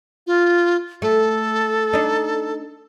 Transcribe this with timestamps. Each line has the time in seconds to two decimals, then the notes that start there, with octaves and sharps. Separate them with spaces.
0.27 F4
1.02 A3 A4
1.93 D4 D#4